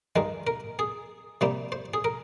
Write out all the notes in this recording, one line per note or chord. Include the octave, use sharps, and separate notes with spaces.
G2 D#3 G#3 A#4
A#4
G#4
C3 G3 A#3 C5
C5
G#4
A#4